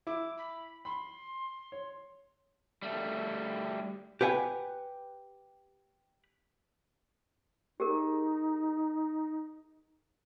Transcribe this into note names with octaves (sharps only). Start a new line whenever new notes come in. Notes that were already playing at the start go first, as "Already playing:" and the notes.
E4 D6
B5
B5 C6
C#5
G3 A3
G4 B4 F#5 G#5
D#4 G4 G#4 A#4